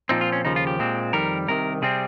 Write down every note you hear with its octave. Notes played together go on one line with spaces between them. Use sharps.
A#2 F3 C4 D#4
F4
C#4
D#2 C#3 F3 D#4
F4
G4
A#2 G#3 C4
F2 D#3 G3 A#4
C2 C3 D#3 A#4
C3 G3 C4 G#4